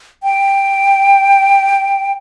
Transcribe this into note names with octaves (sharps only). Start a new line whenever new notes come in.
G5